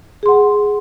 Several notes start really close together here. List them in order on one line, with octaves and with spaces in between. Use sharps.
G#4 C6 F#5